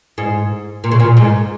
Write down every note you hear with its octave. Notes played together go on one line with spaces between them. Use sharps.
G#2
A#2
C#3
A#2
G#2